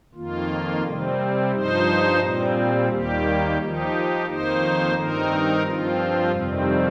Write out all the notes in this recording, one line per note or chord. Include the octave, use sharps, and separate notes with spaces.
F2 D#3 A#3 F4
C3 G3 C4
G2 F3 D#4 C5
A#2 G3 C4
D#2 D#3 G3 A#3 G4
F3 D#4 G4
F2 D#3 A#3 D#4 C5
G2 D#3 C4 D#4 A#4
G2 F3 C4 F4
F2 C3 D#3 G3 C4